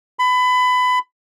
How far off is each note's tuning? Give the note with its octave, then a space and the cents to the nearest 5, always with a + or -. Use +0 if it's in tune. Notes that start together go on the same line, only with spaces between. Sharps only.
B5 +25